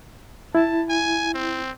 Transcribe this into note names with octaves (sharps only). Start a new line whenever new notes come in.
E4 A5
G#5
C4